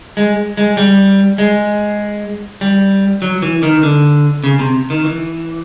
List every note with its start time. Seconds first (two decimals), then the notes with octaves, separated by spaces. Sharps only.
0.17 G#3
0.57 G#3
0.77 G3
1.38 G#3
2.61 G3
3.22 F#3
3.42 E3
3.63 D#3
3.83 D3
4.44 C#3
4.59 C3
4.90 D#3
5.05 E3